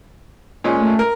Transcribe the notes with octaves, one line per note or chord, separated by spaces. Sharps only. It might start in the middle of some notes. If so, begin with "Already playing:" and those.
A#2 G#3 C#4
A3
A#4